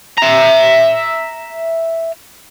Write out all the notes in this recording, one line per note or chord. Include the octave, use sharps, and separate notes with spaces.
E5 A#5